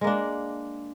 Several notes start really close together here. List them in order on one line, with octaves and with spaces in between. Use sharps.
G#3 A#3 D4